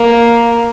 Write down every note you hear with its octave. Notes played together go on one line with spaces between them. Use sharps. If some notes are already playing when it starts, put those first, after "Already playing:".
Already playing: A#3